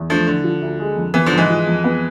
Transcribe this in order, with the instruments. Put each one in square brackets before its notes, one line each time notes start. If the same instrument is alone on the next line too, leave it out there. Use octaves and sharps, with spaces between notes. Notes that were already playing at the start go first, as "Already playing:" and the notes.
Already playing: [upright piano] E2
[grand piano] F3 A3 [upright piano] D4
[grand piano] D3 [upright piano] E3
[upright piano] F3
D2
G#3
F2
[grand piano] E3 [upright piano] B3
[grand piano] D3 F3
[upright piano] G#2
[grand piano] E3 G#3
[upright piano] F3
F2
B3